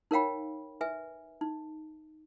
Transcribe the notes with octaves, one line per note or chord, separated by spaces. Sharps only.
D#4 A#4 C#5 F5 G5 B5
B4 E5 G#5
D#4